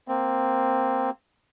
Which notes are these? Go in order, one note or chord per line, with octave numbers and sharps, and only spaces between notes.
A#3 C4